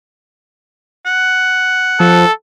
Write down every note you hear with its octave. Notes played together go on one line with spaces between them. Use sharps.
F#5
F3 A4